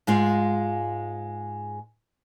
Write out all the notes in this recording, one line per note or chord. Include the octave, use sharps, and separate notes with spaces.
G#2 G#3 F4